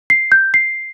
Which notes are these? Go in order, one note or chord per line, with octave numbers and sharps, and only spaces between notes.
C7
G6
C7